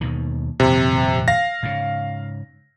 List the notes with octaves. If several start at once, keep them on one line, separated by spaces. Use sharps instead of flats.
D#2 B2 D#3
D#1 F2 C3 E3
F5 A#6
G#2 C#3